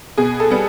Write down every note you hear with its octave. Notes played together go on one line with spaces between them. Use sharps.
B2 G#4
A4
G3 B3